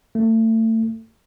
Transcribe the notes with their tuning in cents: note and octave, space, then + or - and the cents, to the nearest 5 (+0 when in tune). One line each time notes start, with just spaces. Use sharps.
A3 +30